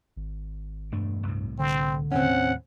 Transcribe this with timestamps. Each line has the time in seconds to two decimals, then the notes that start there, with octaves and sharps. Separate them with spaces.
0.16 G#1
0.92 E1 G2 A3 D4
1.27 C2 A2 C3
1.59 D3 C4
2.12 D#2 A2 C3 C4 C#4 F#5